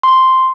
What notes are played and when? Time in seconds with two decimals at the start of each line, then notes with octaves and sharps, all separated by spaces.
0.03 C6